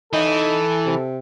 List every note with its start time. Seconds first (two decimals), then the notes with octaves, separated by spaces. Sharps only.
0.13 E3 D#4 A4
0.85 C3